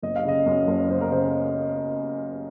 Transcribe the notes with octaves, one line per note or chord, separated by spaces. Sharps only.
F#1 D#5
F5
C#3 D#5
F#2
F#1
F#1 C5
A#4
C#3 C5